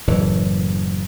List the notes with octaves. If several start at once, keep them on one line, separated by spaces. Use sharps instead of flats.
F#1 A2 E3